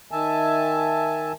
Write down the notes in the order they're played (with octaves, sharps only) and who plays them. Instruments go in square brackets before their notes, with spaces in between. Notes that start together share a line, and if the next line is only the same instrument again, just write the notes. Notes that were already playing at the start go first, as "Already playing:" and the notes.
[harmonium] D#3 E5 G#5 A5